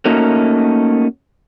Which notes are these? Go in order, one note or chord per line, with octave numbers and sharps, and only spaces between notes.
A3 A#3 C#4 D#4 F#4 A#4